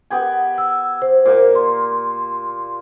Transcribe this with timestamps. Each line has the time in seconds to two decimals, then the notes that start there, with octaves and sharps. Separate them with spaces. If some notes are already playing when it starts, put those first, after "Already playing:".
0.10 B3 G4 G#5
0.58 E6
1.02 C5
1.25 A#2 A#3
1.55 C6